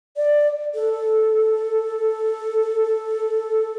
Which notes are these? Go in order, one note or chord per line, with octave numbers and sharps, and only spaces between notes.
D5
A4